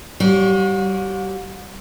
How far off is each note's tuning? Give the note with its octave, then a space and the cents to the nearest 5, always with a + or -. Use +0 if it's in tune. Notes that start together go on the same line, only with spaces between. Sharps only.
G3 -25 F#4 -40 C#5 +0